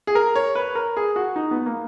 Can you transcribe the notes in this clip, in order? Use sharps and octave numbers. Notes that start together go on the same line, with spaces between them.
G#4
A#4
C#5
B4
A#4
G#4
F#4
D#4
B3
A#3